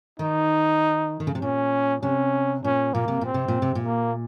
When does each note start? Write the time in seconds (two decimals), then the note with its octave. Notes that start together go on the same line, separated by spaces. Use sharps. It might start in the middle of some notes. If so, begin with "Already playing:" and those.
0.19 D#3 D#4
1.20 D#3
1.27 C#3
1.35 C3
1.41 A#2 C#4
2.03 C3 C#4
2.64 A#2 C#4
2.94 A#2 A#3
3.08 C3
3.21 A#2 C4
3.34 C3
3.48 A#2
3.62 C3
3.75 A#2
3.86 A#3